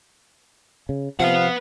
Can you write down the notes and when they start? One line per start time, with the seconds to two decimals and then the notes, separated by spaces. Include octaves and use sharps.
0.89 C#3
1.20 C3 F3 B4 F5 F#5